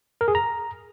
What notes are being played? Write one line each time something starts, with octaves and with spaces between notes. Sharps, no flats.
A#4
G#4
A#5